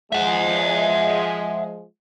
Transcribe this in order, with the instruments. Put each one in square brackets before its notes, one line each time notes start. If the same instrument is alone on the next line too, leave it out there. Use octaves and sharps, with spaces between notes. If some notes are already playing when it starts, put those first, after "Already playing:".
[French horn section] F3 G#3 [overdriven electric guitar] E5 F#5